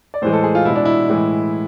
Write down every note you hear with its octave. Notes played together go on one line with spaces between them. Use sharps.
D5
A2 E3 G#3 C5
A4
G#4
F4
B2 G#3 E4
D4
E4
A2 E3 G#3